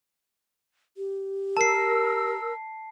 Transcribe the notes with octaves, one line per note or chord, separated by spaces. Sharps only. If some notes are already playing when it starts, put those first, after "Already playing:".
G4
A#4 A5 E6 C7